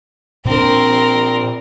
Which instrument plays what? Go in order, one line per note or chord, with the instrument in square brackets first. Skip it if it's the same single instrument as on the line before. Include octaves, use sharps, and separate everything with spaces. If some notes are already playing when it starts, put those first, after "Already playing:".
[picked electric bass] A#2 D4 [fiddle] C4 A#4